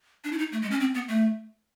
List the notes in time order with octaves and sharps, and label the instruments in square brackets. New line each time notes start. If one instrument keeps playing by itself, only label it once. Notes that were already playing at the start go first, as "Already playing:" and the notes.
[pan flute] D4
E4
D#4
A3
G#3
C#4
C4
B3
A3